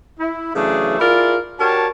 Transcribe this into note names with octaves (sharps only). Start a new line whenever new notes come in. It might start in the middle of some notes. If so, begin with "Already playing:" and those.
E4
C#3 E3 F#3 A3 D4 G#4
E4 F4 G#4 A#4 D5
D4 F#4 G4 A#4 C#5 A5